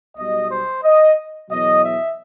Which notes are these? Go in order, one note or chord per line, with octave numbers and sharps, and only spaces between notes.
B1 B2 G3 D#5
C5
D#5
E2 B2 F#3 D#5
E5